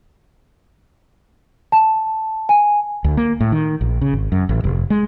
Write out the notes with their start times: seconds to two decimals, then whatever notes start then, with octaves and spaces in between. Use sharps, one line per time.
1.72 A5
2.49 G#5
3.04 D2
3.17 A#3
3.40 A2
3.52 D#3
3.81 A#1
4.01 C#3
4.13 G#1
4.32 F#2
4.49 A1
4.64 F1
4.90 G#3